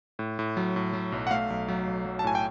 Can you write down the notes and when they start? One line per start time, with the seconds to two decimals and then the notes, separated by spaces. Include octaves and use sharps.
0.19 A2
0.39 A2
0.57 F#3
0.76 A2
0.93 F#3
1.12 B1
1.27 F#5
1.31 A3 F5
1.50 B1
1.68 F#3
1.87 B1
2.06 F#3
2.19 A5
2.24 A2 G#5
2.35 G5